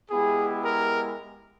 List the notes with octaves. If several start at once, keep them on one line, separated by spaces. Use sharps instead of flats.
G#3 B3 E4 G4 G#4
A#4